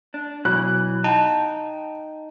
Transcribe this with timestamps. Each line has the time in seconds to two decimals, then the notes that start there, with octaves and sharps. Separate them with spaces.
0.14 D4
0.45 B2 E3 F#3 F#6
1.04 D#4 F5 G5 A5